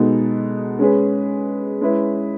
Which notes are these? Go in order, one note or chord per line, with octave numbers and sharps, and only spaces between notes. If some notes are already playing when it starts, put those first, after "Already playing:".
Already playing: B2 G#3 B3 D#4 A4
G#3 C#4 G#4 B4
G#3 C#4 E4 B4